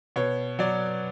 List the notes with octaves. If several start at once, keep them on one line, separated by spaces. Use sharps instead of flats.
B2 C#5
F#3 D5